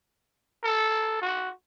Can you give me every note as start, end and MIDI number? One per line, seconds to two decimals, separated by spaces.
0.64 1.19 69
1.22 1.49 66